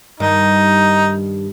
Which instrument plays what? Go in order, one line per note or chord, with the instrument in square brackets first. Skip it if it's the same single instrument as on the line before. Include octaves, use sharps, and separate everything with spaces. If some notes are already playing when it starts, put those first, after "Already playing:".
[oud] G2 D#3 [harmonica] D#4